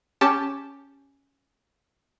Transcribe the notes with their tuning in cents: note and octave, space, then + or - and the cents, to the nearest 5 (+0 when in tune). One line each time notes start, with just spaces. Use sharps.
C#4 +0 G4 +0 A5 +0